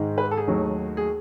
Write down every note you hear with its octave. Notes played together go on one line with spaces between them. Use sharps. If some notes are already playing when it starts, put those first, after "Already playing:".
Already playing: G#2 D#3 G#3
B4
A4
G#4
D#2 D#3 F#3 A3
G#4